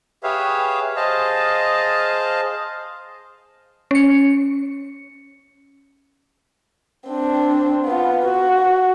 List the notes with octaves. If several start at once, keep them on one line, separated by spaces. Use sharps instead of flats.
G4 G#4 B4 C#5 E5 F5
G#4 C5 D#5 F5 A5
C#4 C#7
C4 D4
B3 F4
F#4